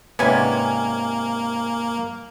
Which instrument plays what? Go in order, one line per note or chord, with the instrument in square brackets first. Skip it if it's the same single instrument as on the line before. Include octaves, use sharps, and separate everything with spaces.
[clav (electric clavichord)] G#2 C3 D5 [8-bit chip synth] A#3 [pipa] B3 C#4 [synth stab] G#5